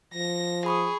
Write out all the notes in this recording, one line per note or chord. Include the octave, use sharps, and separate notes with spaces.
F3 A#6
G#4 B5 C#6 D#6